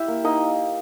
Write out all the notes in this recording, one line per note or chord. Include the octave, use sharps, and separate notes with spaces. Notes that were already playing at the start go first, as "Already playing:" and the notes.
Already playing: E4 G4 E5
A#3
A#3 D#4 D#5